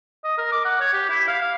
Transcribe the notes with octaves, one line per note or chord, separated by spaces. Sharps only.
D#5
A#4
D6
F#5
C#5
G4
E4
F5
F5